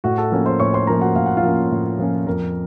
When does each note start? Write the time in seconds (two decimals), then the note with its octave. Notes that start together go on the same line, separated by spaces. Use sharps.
0.04 A2 F#4 F#5
0.18 A4 A5
0.32 F3 A#3 C#4
0.46 C5 C6
0.60 A2 C#5 C#6
0.74 C5 C6
0.87 F3 A#3 C#4 A#4 A#5
1.01 F#4 F#5
1.16 A2 F5
1.26 F#5
1.37 F4 F5
1.43 F3 A#3 C#4
1.71 A2
1.99 F3 A#3 C#4
2.27 F2 A#4